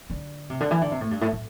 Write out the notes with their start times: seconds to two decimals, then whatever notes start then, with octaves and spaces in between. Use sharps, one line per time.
0.10 D3
0.50 C3
0.60 D3
0.71 E3
0.81 D3
0.91 C3
1.01 A2
1.11 G2
1.21 A2
1.32 A2